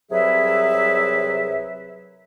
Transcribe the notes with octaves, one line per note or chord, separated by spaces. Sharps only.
C2 C3 F#3 G#4 B4 E5